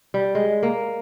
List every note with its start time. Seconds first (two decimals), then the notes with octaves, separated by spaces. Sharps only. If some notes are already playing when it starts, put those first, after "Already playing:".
0.14 G3
0.35 G#3
0.63 A#3